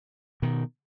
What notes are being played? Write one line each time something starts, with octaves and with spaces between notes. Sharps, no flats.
B2 D#3